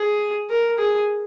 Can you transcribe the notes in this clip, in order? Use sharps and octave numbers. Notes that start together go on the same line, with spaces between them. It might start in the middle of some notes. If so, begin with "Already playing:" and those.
Already playing: G#4
A#4
G#4